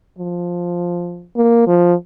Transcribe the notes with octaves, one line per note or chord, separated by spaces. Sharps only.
F3
A#3
F3